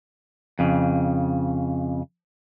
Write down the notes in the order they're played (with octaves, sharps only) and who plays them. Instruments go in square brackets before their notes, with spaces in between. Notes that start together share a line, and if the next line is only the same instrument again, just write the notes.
[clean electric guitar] F2 C#3